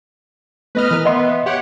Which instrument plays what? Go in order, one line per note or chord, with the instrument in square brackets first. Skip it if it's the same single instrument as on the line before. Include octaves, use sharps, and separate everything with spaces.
[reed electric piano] A3 B3 [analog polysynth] B4 D#5 F6
[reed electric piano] E3 A#4
[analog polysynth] B3 [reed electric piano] D#5 E5 C6
[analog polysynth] G4 C#5 F#5